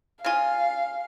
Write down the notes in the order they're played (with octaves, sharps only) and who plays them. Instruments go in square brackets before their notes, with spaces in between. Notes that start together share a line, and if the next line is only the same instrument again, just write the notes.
[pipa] C#3 F4 [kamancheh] F5 [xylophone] G#5 F6